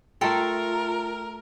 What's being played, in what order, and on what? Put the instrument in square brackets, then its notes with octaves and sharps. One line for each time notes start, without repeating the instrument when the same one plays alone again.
[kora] A3 A4 [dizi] F4 [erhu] A#4 [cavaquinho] G5 A#5 C6